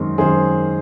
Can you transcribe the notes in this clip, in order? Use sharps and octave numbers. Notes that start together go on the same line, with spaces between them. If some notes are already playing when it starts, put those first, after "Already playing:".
Already playing: F#2 D#3 G#3 C4
F#2 D#3 G#3 C4 G#4 C5